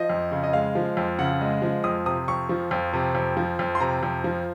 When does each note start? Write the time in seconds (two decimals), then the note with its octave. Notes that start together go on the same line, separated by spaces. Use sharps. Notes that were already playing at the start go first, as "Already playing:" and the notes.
Already playing: F3 D#5
0.10 F2
0.31 C#3
0.43 D#5
0.53 G#3 F5
0.75 F3
0.97 F2
1.19 C#3 F#5
1.41 G#3
1.62 F3
1.84 F2 D#6
2.06 C3 D#6
2.28 F2 C#6
2.49 F3
2.71 F2
2.93 C3
3.15 F2
3.37 F3
3.59 F2
3.75 C6
3.80 C3 A#5
4.03 F2
4.24 F3